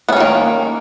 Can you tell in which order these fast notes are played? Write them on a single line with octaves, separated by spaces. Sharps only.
B3 C#4 D#3 A#3